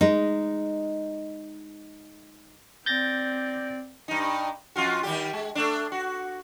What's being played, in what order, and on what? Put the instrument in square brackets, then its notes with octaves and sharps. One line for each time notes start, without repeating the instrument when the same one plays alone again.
[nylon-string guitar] G#3 D#4
[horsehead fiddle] C4 D5 [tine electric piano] G6 A6 A#6
[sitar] G2 D#4
F2 F4 F#4
D#3 G3 G4
G#3
A3 D4
F#4